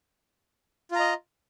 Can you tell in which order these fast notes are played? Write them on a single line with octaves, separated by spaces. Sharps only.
F4 A#5 D#5